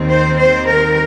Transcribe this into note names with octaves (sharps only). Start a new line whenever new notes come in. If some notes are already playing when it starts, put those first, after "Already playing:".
Already playing: D#2 D#3 C4
C5
C5
A#4